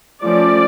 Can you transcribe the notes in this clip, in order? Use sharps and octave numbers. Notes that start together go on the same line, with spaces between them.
F3 A3 C#4 D5